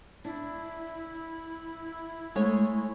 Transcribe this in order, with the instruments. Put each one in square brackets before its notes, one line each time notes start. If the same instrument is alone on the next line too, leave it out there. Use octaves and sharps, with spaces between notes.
[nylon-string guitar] D4 [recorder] E4
[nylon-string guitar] G#3 A3 C#5